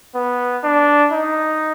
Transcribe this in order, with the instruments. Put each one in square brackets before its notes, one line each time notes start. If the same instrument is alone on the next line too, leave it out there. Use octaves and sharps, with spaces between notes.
[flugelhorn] B3
D4
D#4